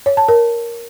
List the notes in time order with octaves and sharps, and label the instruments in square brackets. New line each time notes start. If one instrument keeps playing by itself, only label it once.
[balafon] C#5
A5
A#4